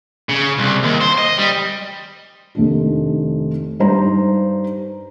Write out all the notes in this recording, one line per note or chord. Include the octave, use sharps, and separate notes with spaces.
C#3
C2
D#2
C5
D#5
G3
F1 D#3 D4
G2 D#4 C5 A#5